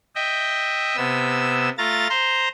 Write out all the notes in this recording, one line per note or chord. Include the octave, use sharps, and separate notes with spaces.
D#5 E5 G5
C3 B3 E6
A3 F4 A#5 A6
C5 A#5 C6